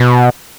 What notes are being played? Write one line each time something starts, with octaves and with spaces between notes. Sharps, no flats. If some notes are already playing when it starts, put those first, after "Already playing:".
Already playing: B2